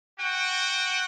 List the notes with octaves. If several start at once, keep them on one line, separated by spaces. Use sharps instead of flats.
F#4 F#5 G5